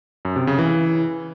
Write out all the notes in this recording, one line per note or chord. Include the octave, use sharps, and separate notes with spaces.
F#2
C3
C#3
E3